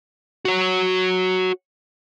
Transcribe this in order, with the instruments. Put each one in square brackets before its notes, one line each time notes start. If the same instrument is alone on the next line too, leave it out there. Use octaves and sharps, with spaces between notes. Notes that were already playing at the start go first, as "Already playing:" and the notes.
[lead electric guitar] F#4 C#5